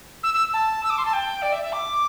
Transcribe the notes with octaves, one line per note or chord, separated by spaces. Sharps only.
E6
E6
A5
E6
D6
C6
A5
G5
D5
E5
E5
D6